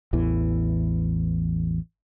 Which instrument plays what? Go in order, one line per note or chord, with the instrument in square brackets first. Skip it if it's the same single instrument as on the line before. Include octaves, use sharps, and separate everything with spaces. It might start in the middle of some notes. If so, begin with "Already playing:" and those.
[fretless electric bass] A1 E2 E3